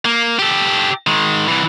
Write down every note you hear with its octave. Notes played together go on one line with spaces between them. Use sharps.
A#3
G4 A4
D#3 G#3
C2 E3